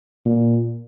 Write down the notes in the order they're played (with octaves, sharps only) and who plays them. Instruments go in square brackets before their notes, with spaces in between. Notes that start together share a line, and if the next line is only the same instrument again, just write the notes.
[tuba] A#2